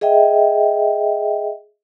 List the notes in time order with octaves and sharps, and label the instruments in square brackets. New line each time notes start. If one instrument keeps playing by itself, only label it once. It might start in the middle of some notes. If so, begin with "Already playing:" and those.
[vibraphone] G#4 D#5 E5 G5